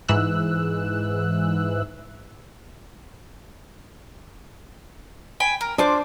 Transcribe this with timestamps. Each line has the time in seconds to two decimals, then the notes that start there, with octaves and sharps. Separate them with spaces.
0.08 G#2 E3 E6 F#6
5.40 G5 G#5 B5
5.61 A#4
5.78 D4 F4 C5 D6